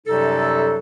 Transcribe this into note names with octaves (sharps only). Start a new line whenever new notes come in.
F#2 C3 F#3 G3 D#4 A4